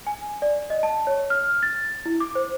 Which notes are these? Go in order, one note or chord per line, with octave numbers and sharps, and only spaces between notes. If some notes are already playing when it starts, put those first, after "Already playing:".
G#5
D5
D#5
A5
C#5
F6
A6
E4
D6
C5